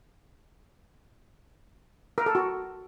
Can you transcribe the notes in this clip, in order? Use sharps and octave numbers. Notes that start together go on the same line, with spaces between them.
A#4
A4
F#4